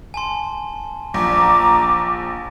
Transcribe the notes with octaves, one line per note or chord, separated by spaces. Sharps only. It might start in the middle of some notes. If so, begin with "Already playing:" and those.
G#5 A5 C6
A#1 A#5 D6